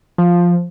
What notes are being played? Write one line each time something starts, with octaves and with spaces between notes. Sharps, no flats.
F3